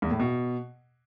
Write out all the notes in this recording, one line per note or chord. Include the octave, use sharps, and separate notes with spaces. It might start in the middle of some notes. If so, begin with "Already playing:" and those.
E2
A2
B2